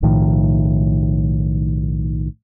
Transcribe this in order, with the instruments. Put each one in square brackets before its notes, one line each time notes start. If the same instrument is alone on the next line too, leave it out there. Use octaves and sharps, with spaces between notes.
[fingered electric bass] B1 A2 D#3 F3